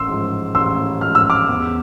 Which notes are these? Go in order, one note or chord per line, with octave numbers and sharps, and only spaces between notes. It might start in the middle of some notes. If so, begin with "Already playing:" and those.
Already playing: A1 C6 E6
G#2 F3
A1 C6 E6
G#2 F3 F6
E6
D6 F6
E2